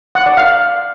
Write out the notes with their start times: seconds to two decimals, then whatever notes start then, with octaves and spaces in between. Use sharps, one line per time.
0.15 F#5
0.26 D5
0.37 F5